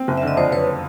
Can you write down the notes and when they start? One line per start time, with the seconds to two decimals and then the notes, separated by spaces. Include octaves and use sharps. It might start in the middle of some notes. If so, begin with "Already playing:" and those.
Already playing: C4
0.08 F#1
0.17 E5
0.23 D3 D#5
0.37 F2 C5 D5
0.52 F#1 B4 C#5